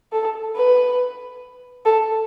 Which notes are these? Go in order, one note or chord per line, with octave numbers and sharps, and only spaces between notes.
A4
B4
A4